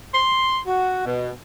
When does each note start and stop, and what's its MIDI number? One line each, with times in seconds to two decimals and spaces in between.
0.14 0.58 84
0.67 1.04 66
1.05 1.29 47